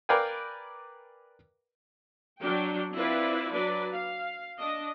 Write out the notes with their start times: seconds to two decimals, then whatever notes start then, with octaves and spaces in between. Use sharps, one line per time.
0.09 A#4 B4 D5 F5 G5 G#5
2.41 F#3 D4 F#4 G5
2.93 C4 E4 F4 B4 D5
3.52 F#3 D4 F#4 B4 D5
3.94 F5
4.59 D4 D#5